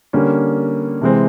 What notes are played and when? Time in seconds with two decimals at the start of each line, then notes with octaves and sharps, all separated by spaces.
0.13 D3 G3 A#3 C#4
1.01 C3 E3 G#3 C4